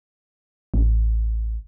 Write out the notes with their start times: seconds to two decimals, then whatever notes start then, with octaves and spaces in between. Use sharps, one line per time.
0.74 A1